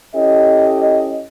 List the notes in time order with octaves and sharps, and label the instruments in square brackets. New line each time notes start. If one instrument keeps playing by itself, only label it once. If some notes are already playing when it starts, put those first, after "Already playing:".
[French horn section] C#4 E4 G4 A4 D#5